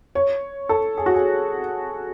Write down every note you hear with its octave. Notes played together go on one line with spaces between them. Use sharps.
C#5
A4
G#4
F#4
G#4